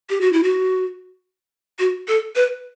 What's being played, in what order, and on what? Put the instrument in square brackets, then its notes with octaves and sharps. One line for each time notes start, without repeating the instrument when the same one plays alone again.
[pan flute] G4
F#4
E4
F#4
F#4
A4
B4